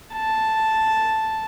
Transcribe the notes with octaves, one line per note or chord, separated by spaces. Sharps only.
A5